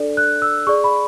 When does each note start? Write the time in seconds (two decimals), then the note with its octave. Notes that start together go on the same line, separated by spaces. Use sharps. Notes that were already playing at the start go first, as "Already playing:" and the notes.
Already playing: D4 A4 D5
0.17 F#6
0.42 E6
0.67 G#4 D5 C#6
0.84 B5